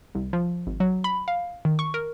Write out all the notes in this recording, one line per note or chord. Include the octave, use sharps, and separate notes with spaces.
C2
F3
G#1
F#3
B5
F5
D#3
C#6
A#4